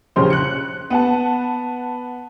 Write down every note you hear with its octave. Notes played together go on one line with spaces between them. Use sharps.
A#1 C#3 C#4 G4 C5 C6
F#6 C#7
B3 F#5 A5